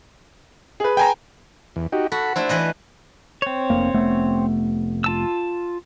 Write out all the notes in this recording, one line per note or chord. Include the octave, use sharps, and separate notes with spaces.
G#4 B4
G5 G#5 A#5
E2
D#4 F#4 G4
F#4 A4 B5
A3 D4 E4 C5
E3 B4 D#5
C4 C#5
F1 F2 A#3
F1 A3 B3
F4 A5 E6